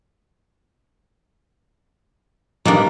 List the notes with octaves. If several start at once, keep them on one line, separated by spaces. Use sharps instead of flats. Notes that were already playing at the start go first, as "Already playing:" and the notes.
G2 D#3 G3 A#3 D4